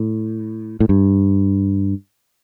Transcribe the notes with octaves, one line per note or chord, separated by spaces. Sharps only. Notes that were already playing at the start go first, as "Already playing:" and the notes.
Already playing: A2
A2
G2